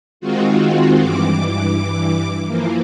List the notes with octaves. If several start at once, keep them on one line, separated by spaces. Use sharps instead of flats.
D#3 G#3 C4 F4 F#4
G2 E3 D6
E3 F3 A#3